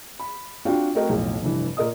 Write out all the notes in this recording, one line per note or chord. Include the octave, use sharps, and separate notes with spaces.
B5
C4 D4 F4 F#4 F5 G5
A3 C4 F#4 A#4 D#5 G5
B1 F2 A2
F1 G2 E3
A#2 A#4 D#5 D#6